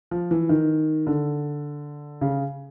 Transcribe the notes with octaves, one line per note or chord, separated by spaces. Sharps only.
F3
E3
D#3
D3
C#3